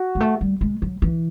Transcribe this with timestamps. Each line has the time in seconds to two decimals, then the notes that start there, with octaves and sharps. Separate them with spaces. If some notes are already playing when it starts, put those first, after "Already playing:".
Already playing: F#4
0.15 G#3
0.20 A3
0.41 G3
0.61 G#3
0.82 F#3
1.02 E3